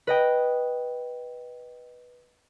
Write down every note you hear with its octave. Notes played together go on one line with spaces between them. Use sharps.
B4 D#5 G5